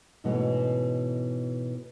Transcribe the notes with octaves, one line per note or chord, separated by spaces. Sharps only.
G#2 B2 E3 A3 B3 C#4